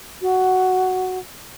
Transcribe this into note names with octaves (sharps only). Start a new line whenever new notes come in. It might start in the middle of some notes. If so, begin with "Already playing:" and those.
F#4